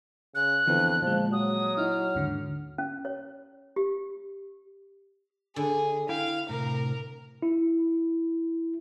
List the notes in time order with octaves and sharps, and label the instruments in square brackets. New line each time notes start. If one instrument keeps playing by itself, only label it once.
[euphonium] C#3 [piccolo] F#6
[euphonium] F2 [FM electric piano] D3 E3 B3
[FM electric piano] A#2 G#3 [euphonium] F3
[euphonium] F#3 [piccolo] D#6
[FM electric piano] D#4 E4 [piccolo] F6
[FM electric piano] D#2 G#2 D3
[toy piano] C#4
C#5
G4
[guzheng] D3 [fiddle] G#4
[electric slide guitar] E4 G5 [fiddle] F5
[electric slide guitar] A2 C3 [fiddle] A#4
[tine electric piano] E4